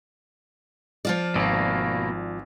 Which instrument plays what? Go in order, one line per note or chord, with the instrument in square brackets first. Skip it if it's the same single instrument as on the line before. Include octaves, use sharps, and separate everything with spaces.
[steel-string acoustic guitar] F3 F4 D5
[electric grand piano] G#1 [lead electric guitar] B2 A#3